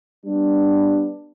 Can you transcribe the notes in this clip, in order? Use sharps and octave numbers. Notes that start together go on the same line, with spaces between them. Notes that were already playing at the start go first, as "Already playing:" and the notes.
G3 B3 D4